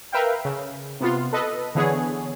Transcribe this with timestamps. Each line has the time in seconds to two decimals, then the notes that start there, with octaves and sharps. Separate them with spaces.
0.12 A#4 B4 E5 F5 G5
0.45 C#3
1.00 C3 B3 F4
1.33 A4 B4 D#5
1.75 D3 E3 B3 G#4 C#5